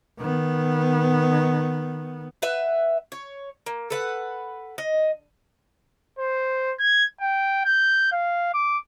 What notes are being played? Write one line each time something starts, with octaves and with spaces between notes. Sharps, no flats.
D#3 B3
B4 E5 F#5
C#5
A#3
A4 B4 F#5
D#5
C5
G#6
G5
G6
F5
D6